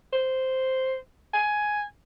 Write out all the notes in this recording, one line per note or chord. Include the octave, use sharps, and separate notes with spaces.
C5
G#5